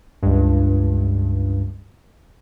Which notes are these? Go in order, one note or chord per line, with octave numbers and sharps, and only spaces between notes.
C#2 G2